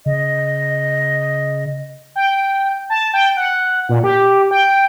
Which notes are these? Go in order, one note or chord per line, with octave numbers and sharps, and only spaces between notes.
C#3 D#5
G5
A5
G5
F#5
A#2
G4
G5